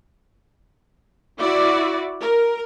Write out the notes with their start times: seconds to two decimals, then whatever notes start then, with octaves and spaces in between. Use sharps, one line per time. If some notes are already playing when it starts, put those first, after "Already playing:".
1.40 E4 F#4 D5
2.21 A#4